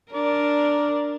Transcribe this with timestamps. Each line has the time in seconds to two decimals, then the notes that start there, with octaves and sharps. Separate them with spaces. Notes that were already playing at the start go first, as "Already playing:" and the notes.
0.12 D4 A#4 D5